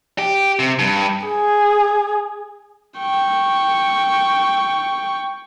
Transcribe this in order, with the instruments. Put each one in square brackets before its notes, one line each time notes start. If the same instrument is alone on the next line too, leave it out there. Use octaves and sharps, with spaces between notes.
[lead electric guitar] G4
C3
G2
[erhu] G#4
[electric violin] G5 C#6